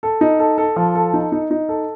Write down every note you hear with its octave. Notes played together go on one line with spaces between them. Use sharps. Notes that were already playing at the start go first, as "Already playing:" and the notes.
A4
D#4
A4
A4
F3
A4
D#4
D#4
D#4
A4